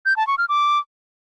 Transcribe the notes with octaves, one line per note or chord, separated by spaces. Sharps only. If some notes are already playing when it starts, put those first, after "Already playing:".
G6
A5
C#6
F6
D6